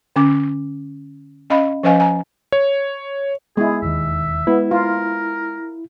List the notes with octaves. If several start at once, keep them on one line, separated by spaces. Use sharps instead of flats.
D3 C#4 D6
C#4 D#5 F5 B5
F3 C#4 B4 D#5 F5 G#5
G#5 A#5
C#5
G#3 B3 E4 G#4
E1 D#2 D#3 E5
G#3 B3 E4
F4 A#4